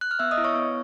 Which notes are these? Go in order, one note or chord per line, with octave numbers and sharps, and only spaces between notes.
F#6
F6
B3 E5 E6
D#5 D#6
E4
C#5 C#6
B3